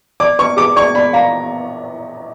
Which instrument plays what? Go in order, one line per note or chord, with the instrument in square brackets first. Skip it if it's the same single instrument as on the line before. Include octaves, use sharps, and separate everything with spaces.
[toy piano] D5 [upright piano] D6
[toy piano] B4 [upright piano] C#6
[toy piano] G#4 [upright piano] D6
[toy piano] D5 [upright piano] C#6
[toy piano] D5 [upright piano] B5
[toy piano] F5 [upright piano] A#5